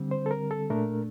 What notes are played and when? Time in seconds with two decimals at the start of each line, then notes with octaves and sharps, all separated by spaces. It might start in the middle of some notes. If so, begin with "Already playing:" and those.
Already playing: D3 G3 C4
0.11 C5
0.26 A4
0.31 A#4
0.51 A4
0.70 A#2 A3 D4 A#4